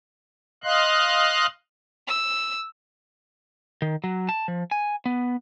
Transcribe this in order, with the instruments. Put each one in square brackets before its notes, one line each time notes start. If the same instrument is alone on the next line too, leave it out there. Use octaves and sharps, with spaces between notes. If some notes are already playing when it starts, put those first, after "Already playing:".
[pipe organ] D#5 F5 C6 F#6
[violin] E6
[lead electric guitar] D#3
F#3
A5
F3
G#5
B3